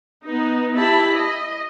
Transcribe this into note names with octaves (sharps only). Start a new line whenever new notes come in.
B3 D#4
E4 G4 A5 B5
D#5